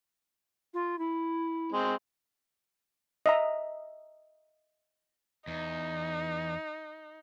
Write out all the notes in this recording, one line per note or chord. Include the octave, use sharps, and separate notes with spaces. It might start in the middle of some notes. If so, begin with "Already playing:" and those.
F4
E4
G#3 C4
D#5 E5 A#5
E2 D#4